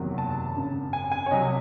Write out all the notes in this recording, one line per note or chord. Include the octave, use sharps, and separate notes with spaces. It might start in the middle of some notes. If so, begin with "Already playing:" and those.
Already playing: F#1 E2 C3 D#3 F#3
A5
G#1 F#2 C#3
G#5
G#5
C#5
C2 C3 F#3 D#5